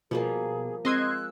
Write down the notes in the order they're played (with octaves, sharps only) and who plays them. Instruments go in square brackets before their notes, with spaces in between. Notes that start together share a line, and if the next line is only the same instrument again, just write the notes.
[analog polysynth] B2 [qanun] F3 G3 A#3 [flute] G#4
[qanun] G#3 [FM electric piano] C4 E6 [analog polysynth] D#5 C6 G#6 [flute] F#6